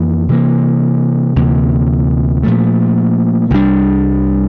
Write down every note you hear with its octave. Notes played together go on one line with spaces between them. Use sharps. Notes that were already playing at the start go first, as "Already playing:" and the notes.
Already playing: F2 E3 A#3
C3 E3 A#3
D2 C3 E3 A#3
A#2 F3 A3
C2 C3 G3 D4